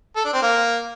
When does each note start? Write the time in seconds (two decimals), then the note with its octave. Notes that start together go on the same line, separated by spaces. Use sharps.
0.16 A4
0.25 D4
0.34 C4
0.42 A#3